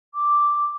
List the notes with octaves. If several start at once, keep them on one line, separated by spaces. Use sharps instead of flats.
D6